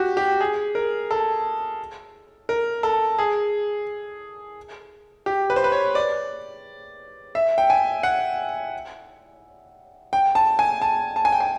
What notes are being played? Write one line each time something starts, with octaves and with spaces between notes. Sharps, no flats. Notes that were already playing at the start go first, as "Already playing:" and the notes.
Already playing: F#4 G4
G4
G#4
A#4
A4
A#4
A4
G#4
G4
B4
C5
B4
C#5
D5
E5
G5
G#5
F#5
G5
A5
G#5
A5
A5
G#5
G5
G#5